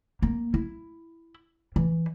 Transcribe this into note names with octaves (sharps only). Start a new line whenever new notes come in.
A#3
E4
E3